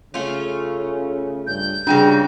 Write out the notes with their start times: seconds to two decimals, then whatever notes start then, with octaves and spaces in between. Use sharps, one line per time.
0.14 C#3 A3 C#4 F4
1.47 G2 G6
1.87 C#3 E3 F#3 G3 D4 G5 A#6